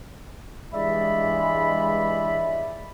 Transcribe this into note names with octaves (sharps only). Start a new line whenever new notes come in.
G2 E3 G#3 D5 E5 B5